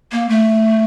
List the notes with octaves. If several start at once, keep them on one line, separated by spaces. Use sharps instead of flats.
A#3
A3